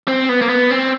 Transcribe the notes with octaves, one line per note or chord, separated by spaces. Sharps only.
C4
B3
A#3
B3
C4